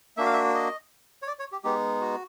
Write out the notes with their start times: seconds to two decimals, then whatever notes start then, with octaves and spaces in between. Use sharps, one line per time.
0.17 A#3 D4 F#4 E5
0.26 F5
0.33 E5
0.54 D#5
1.22 C#5
1.27 D5
1.39 C#5
1.52 G4
1.64 G#3 B3 D#4 G4
2.01 F#4